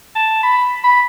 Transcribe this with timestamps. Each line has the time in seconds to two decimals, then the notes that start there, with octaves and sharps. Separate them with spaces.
0.16 A5
0.43 B5
0.84 B5